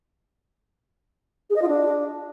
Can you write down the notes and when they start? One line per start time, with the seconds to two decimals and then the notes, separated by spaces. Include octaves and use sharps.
1.50 G#4
1.56 D#5
1.62 F4
1.68 D4